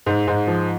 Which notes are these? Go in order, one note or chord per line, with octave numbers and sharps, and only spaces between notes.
G#2
G#2
F3